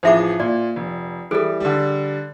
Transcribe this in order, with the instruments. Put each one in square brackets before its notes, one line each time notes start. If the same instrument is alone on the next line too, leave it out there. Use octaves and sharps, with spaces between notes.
[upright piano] A1 F3 G#4 [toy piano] C5 E5 D6
[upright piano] A#2 [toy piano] D5
[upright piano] F1
[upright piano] E3 G3 [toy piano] G#4 A4
[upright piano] D3 G3